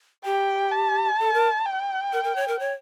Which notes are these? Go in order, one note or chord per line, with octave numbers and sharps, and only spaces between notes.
G4 G5
A5
A4
A#4
G5
A#4
A#4
C#5
A#4
C#5